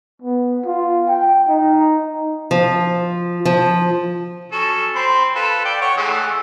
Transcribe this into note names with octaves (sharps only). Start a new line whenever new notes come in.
B3
F4
G5
D#4
F3
F3
F#3 C#4 A4
C4 B5 C6
F4 A4 B4
D5 G5
C#5 F#5
E3 G#3 A3